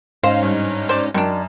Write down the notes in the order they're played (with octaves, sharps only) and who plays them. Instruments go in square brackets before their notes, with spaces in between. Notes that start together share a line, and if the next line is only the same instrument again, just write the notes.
[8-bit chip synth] G#2 C#4 D#4 [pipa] C5 [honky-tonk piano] F5
[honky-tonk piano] G2
[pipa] C5 D5
[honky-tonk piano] F#2 [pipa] D#3 D4